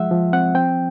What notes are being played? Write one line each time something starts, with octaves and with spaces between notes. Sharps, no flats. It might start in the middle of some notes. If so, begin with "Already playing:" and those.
Already playing: F3 G#3 E5 F#5
F3
C4 F#5
C4 G5